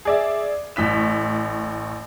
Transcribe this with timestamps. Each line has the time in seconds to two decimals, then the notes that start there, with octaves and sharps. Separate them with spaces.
0.05 G#4 D5 E5
0.76 A1 A2 B6 E7